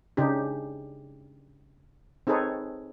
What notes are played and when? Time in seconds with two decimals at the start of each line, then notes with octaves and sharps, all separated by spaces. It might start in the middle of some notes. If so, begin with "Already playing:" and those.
0.17 C#3 D4 D#4 G4
2.27 C4 D#4 G#4 A4 B4 C#5